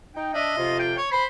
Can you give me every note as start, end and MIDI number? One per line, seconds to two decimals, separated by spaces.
0.15 0.33 63
0.15 0.33 79
0.34 0.54 62
0.34 0.77 75
0.34 0.54 76
0.57 0.96 41
0.57 0.96 48
0.57 0.96 65
0.79 0.96 79
0.97 1.09 73
1.12 1.26 72
1.12 1.24 83